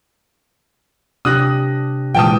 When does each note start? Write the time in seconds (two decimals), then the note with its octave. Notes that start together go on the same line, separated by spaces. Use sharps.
1.25 C3 D4 G4 D#6 F#6 A#6
2.15 A#2 E3 G#3 G5 A5 D#6